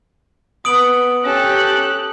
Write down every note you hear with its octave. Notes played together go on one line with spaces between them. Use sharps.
B3 D#6 D7 F#7
C#4 G4 A4 F#6